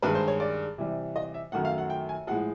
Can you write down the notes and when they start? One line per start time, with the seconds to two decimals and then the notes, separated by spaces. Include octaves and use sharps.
0.02 G2 D#3 G#3 B4
0.15 C5
0.28 C#5
0.40 D5
0.78 C3 E3 G3
1.16 D#5
1.34 E5
1.52 F#2 D#3 F#3 A3 F#5
1.65 F5
1.78 F#5
1.90 G5
2.09 G#5
2.27 A2 F3 G#3 F#5